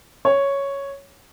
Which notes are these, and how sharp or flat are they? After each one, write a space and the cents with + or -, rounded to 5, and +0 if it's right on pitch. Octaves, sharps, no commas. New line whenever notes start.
C#5 +0